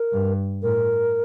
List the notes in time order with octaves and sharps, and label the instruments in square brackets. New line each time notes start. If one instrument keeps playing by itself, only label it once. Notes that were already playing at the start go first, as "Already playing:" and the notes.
Already playing: [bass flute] A#4
[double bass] G2
[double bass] A2 [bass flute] A#4